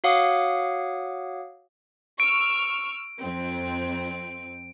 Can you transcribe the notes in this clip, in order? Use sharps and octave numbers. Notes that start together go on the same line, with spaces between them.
F#4 C#5 F5 F#5 D6 D#6
C#6 E6 F6 D7
F2 C4